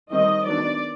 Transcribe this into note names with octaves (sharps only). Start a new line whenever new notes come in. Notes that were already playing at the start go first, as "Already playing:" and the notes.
D#3 G3 C4 D#5
D#3 F#3 B3 D4 D5